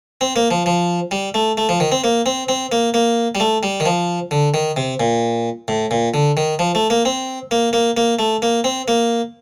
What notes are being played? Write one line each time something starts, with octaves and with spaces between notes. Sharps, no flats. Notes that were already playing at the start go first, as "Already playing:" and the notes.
C4
A#3
F3
F3
G3
A3
A3
F3
D#3
C4
A#3
C4
C4
A#3
A#3
G3
A3
G3
D#3
F3
D3
D#3
C3
A#2
A2
A#2
D3
D#3
F3
A3
A#3
C4
A#3
A#3
A#3
A3
A#3
C4
A#3